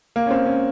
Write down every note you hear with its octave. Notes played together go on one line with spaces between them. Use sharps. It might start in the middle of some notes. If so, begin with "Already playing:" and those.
A#3
C#4
C4
C#4